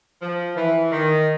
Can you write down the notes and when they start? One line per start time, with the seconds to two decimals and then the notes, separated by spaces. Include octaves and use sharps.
0.22 F3
0.57 E3
0.92 D#3